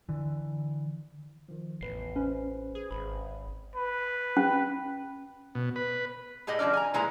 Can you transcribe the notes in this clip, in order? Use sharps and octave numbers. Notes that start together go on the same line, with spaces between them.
D3 E3
D#3 F3
A1 E2 B4 C7
C#4 B4 C5
G#4
G#1 B5
B4
C#4
B2
B4
A2 G4 G#4 D#5
D3 F3 C#4 D#4 D5
G#5 A#5
A#2 E3 G#3 A#3 G#4 A#5